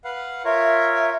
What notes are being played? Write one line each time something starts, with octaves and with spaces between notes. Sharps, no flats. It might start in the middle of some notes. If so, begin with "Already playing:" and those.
B4 F5 F#5
F4 A#4 C#5 E5